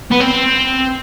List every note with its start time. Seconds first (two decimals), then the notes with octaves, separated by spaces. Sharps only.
0.11 B3
0.21 C4